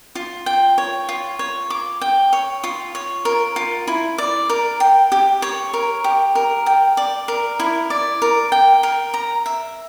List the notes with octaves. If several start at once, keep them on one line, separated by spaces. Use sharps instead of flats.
F4
G5
C#5
F4
C#5
D6
G5
C#5
F4
C#5
A#4
F4
E4
D5
A#4
G5
G4
C#5
A#4
G4
A#4
G5
D5
A#4
E4
D5
A#4
G5
A#4
A#5
E5